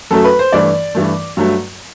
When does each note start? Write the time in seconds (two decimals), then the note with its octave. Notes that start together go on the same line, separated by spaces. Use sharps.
0.11 F#2 F#3 A3 A4
0.24 B4
0.39 C5
0.52 G2 E3 A3 D5
0.95 G2 E3 A3
1.37 G2 F#3 A3